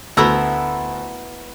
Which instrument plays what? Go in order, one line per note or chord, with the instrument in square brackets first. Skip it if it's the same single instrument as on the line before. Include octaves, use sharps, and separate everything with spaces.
[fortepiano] D2 A3 E6 [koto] B3 E4 A#5